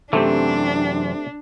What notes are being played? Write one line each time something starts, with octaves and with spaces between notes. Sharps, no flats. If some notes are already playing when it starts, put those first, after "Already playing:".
F#2 C3 E3 A3 C4 D4 G4